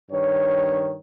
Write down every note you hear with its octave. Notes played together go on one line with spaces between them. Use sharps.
G2 D#3 C#5